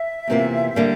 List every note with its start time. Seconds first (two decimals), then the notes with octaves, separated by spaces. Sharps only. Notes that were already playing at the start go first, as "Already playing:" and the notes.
Already playing: E5
0.28 E2 C3 E3 A#3 F4
0.76 D3 G3 A#3